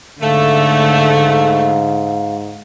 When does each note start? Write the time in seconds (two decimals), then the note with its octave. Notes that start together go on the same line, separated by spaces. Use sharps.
0.21 G#2 D3 A3 F5